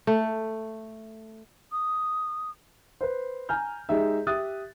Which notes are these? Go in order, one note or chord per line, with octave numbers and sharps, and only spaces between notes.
A3
D#6
B4 C5
G#5 A#5 F6 G6
G#3 D#4 G4 G#4 E5
G4 E5 D#6 F#6 A6